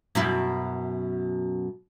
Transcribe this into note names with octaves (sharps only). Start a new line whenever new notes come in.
F#2 B2 E4